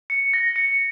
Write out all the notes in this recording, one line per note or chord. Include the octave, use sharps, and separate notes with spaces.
C#7
A#6
C#7